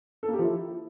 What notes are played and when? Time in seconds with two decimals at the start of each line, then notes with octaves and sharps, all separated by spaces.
0.23 A4
0.28 A#3
0.33 G4
0.39 F3
0.44 E4